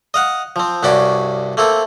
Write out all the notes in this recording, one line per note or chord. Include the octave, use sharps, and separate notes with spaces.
D#5 F5 F#5
F3 C4
C2 G2 C#4 F#4 D5 B5
A3 A#3 C4 A4